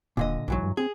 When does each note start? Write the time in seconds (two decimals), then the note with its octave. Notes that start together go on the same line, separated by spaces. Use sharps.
0.17 D#1 A#2 D3 D#5
0.48 B1 G#2 E3 F#3
0.63 G2
0.77 C4 G#4